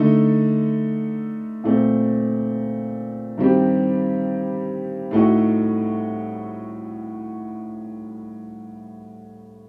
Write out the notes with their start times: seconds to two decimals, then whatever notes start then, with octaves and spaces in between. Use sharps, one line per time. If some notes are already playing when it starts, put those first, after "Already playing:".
Already playing: D3 A3 D#4
1.64 A#2 A3 C4
3.38 G2 D#3 G3 C4 G4
5.11 A2 A3 D#4 F#4